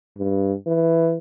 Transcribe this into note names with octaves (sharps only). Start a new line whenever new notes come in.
G2
E3